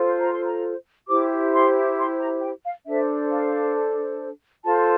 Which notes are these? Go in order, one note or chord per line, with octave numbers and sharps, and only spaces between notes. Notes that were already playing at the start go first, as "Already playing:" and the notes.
Already playing: F4 A4 C5
A#5
C6
A#5
E4 G4 C5 D6
C6
C6
A#5
G5
F5
D4 A4 C5 E5
F5
F4 A4 C5 A5